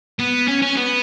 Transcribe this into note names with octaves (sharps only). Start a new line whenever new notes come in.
B3
C#4
C#4
B3